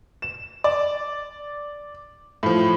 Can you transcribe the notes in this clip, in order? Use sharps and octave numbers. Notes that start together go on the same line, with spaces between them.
E7
D5
A2 F3